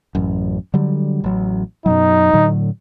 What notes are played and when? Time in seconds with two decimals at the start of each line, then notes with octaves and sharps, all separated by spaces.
0.15 A1 F#2
0.74 D3 F#3 G3
1.24 A1 F#3
1.86 F#2 B2 F#3 D#4
2.33 A2 D3 F#3